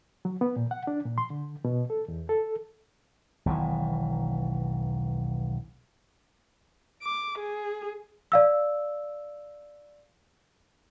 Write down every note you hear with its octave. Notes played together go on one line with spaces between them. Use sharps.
F#3
B3
A#2
F#5
D4
A#2
C6
D3
B2
A4
E2
A4
E1 B1 D#3 E3
D6
G#4
D5 F5 E6